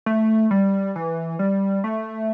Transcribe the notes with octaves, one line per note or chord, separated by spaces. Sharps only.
A3
G3
E3
G3
A3